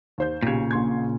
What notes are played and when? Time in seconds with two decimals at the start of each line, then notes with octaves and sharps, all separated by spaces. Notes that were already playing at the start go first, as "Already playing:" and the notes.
0.18 D#2 C5 G6
0.43 B1 A#2 C#3 G4 G#6
0.71 A#1 C6 G#6